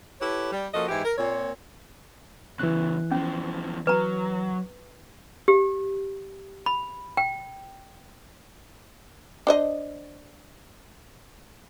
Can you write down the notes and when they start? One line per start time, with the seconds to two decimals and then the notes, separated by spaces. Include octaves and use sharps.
0.21 E4 G4 A4 B4 C#5
0.52 G3
0.74 F3 A#3 C#4 F#4 A4 D#5
0.89 G#2 E3 G#3 E4 G4
1.05 A#4
1.18 A#2 C4 C#5
2.59 E2 C#3 E3 F#6
3.11 E2 F3 C#4
3.87 F#3 B4 A#5
5.48 G4
6.66 B5
7.17 G5
9.47 D4 C5 D#5